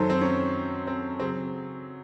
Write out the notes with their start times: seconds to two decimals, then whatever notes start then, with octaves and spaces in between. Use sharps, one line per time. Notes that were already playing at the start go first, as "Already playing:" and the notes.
Already playing: F#2 D#3 F#3 A4 C5
0.10 C4
0.21 C#4
0.87 C4
1.20 C#3 F#3 C4